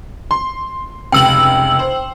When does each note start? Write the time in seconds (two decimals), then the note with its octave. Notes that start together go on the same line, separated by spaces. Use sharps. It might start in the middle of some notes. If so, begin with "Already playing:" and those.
0.31 C6
1.12 F1 C#2 G5 E6 F#7
1.79 C5